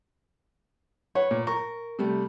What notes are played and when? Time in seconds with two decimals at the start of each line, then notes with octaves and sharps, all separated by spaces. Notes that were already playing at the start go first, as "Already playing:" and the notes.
1.15 B4 C#5 F#5
1.31 A#2
1.47 A#4 C#6
1.99 C3 G3 A3